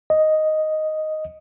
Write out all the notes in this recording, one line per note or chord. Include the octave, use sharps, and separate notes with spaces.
D#5